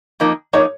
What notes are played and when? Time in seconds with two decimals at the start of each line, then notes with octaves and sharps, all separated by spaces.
0.20 F2 F3 A#3 D#4
0.53 F3 A#3 D#4 C#5